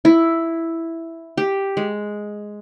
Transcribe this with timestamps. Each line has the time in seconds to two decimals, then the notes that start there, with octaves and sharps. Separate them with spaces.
0.05 E4
1.38 G4
1.77 G#3